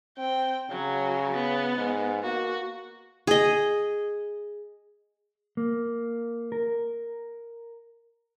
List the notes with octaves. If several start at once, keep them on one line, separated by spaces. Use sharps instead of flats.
C4 G5
C#3 F#3
B3
G#2
A#3 F#4
G#4 D#5
A#3
A#4